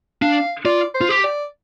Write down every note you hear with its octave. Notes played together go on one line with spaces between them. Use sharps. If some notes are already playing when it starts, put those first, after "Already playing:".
D4 F5
F4 D5
C5
F4
G4
D5